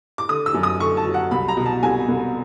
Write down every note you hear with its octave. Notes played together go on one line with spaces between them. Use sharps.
D6
D3 D#6
E6
F#2
D#6
D3 C#6
A5
F#3
F#5
C2 B5
A#5
B2
A5
C2 G#5
C2